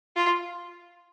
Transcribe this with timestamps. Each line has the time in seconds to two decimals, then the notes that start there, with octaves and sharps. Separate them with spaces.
0.17 F4